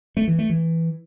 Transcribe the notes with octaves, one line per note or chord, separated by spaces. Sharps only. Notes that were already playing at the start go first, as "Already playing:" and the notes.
A3
E3
A3
E3